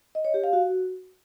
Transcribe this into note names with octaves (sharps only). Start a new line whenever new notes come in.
D#5
C#5
G4
F5
F#4